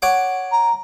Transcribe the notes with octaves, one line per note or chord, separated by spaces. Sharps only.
C#5 F#5 D6
A#5